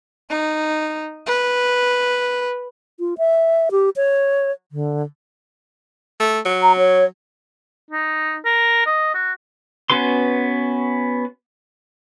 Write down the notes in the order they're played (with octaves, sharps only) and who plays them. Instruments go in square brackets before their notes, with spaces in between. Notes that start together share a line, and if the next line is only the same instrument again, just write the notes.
[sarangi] D#4
B4
[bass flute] F4
E5
G4
C#5
D3
[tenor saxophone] A3
F#3
[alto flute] A#5
C#5
[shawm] D#4
A#4
D#5
F#4
[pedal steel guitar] B3 C#4 F#4 B4 C6